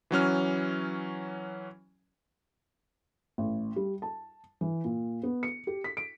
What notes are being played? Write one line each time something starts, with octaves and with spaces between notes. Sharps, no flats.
E3 F#3 C#4 F6
A1
G3
A5
E3
A#2
B3
C#7
G4
B6
D7